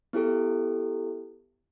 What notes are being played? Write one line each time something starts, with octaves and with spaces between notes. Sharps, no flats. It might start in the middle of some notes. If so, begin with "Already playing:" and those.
B3 E4 G4 A4